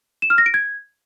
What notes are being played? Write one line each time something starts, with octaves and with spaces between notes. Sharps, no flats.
E7
F6
A#6
D7
G#6